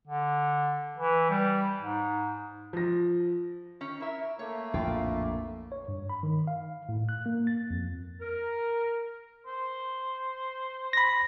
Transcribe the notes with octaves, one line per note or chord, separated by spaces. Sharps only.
D3
E3
G3
G#2
F3 A#6
D#3 C#4
E4 A#4 E5
A3 A#3 C#5
A#1 F2 A2 F4 G5
C#5
G2
B5
D#3
F5
A2
F#6
A#3
A6
F2
A#4
C5
B5 A#6